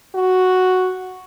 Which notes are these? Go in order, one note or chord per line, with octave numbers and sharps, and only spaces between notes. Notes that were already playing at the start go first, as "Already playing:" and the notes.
F#4